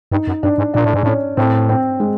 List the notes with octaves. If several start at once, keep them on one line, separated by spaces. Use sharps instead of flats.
G2 D#4
F#2
G2 D4
G#2
A#2 D4
A2
G#2
A2 C#4
A2 C4
C4
G#3